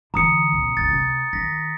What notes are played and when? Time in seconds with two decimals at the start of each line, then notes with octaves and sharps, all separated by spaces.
0.14 D3 E3 A#5 D#6 C#7
0.52 C#2 B2
0.77 F#1 C#2 A6
0.91 C3
1.33 D#3 A#6 B6